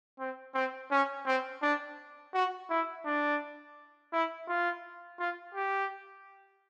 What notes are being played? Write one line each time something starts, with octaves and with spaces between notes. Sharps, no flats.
C4
C4
C#4
C4
D4
F#4
E4
D4
E4
F4
F4
G4